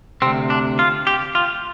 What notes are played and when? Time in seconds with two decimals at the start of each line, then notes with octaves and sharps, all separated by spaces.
0.22 D2 C3 C4
0.50 D4
0.79 F4
1.07 G4
1.35 F4